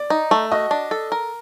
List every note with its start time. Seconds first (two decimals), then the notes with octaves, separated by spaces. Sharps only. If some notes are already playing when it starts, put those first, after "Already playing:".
Already playing: D5
0.10 D#4
0.31 A3
0.52 F#4 D#5
0.71 D4
0.91 A4
1.12 A#4